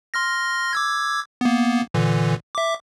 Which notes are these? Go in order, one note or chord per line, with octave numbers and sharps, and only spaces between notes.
C6 F6 A#6
D6 E6 G#6
A#3 B3
A#2 D3 E3
E5 D6